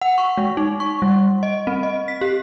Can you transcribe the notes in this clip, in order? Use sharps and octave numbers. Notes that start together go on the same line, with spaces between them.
F#5
C#6
G#3
D#4
C#6
G3
D#5
C4
D#5
B6
G4